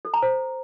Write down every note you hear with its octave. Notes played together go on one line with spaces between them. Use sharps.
A4
A#5
C5